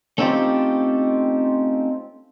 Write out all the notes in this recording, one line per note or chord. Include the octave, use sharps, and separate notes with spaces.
A3 C4 C#4 D#4 F4 G4